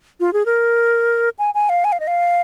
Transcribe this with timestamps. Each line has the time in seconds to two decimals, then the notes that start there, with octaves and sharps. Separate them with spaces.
0.20 F4
0.33 G#4
0.46 A#4
1.39 G#5
1.54 G#5
1.69 F5
1.84 G#5
1.92 F5
2.00 D#5
2.07 F5